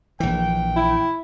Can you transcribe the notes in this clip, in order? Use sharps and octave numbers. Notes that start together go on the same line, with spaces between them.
A#1 E3 G5
E4